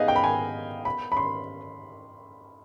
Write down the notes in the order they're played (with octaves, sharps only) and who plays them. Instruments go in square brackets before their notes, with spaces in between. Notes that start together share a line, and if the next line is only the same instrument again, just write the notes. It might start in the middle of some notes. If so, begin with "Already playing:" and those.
Already playing: [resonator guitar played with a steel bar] B3 D#4 G#4 [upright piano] D#5 F5
[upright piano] G5
B5
G#5
B5
B5
C6